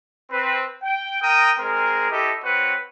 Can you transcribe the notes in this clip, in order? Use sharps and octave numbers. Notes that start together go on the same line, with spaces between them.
C4 B4
G5
A#4 G5 A#5 D#6
G#3 C4 G#4 A#4
E4 G4 A4 D#5
C4 F#4 B4 C#5 F#5